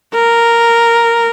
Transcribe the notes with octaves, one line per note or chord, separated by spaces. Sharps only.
A#4